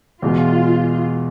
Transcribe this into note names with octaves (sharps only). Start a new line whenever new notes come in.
E2 B2 G#3 F4